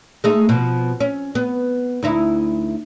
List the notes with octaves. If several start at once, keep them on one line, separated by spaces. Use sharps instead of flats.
G#3 A3 D#4
B2 F3
C#4
B3
D2 D#4 E4